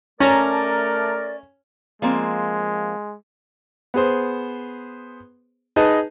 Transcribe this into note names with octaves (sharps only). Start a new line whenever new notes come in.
A3 C#4 A#4 D5 A5 A#5
F3 G#3 A#3 C4
B3 G#4 C5
D#4 G#4 B4 D#5 A5